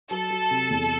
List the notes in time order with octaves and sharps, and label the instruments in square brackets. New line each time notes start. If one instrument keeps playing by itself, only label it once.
[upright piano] F#3 [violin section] A4
[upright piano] F#3
C3
E2